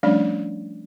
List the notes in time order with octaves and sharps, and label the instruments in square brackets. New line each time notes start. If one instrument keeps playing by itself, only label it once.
[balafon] F3 G3 A3 C#4 D4 D5